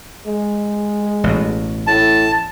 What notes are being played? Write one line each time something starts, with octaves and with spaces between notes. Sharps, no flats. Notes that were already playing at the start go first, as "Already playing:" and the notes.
G#3
A1 B2
A2 A5